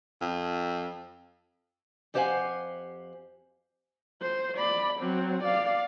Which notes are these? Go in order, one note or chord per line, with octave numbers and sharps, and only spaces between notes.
F2
F2 G4 C5 F5 F#5 G#5
C5
D5 B5
F#3 C4
D5 F5